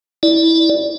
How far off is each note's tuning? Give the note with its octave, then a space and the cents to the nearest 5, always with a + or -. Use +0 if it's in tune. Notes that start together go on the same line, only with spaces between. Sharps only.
E4 -15 D5 +0